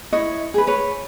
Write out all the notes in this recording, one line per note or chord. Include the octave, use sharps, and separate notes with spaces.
E4 C#5 D#5
G#4 B4
B4 C#5